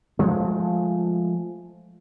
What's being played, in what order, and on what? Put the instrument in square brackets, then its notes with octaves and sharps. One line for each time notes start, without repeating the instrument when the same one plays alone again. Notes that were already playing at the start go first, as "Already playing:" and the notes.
[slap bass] F3 G#3 A3